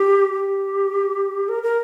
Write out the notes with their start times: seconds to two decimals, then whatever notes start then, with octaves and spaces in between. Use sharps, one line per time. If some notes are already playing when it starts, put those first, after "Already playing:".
Already playing: G4
0.33 G4
1.49 A#4
1.63 A#4